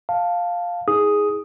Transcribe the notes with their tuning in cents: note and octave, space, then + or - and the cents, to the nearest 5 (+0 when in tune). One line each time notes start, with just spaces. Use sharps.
F5 +5 A5 +0
D#4 +45 G#4 +0 D#6 +0